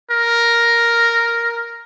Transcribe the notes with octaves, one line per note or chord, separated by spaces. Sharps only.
A#4